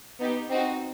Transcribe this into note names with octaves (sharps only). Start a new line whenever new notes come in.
B3 D#4 G4
C4 D#4 F#4